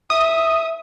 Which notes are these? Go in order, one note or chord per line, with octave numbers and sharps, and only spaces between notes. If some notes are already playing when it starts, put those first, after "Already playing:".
E5 D#6